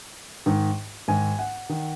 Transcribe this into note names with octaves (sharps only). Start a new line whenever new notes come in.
G#2 D#3
G#2 D#3 G#5
F#5
D#3